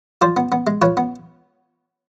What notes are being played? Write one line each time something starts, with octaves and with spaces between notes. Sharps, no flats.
F3 C5 D5
B3
B3
G#3
F3 B4 C#5
B3